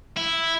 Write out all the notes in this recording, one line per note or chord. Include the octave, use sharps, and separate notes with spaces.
E4